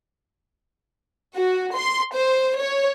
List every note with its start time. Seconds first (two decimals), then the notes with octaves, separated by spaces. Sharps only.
1.36 F#4
1.77 C6
2.14 C5
2.60 C#5